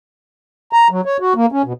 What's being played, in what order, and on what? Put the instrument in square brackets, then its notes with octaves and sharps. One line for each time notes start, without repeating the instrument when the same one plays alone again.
[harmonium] A#5
F#3
C#5
F#4
A#3
C#4
B2